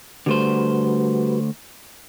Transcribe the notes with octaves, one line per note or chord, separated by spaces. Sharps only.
D3 G3 A3 F#4 B4 C5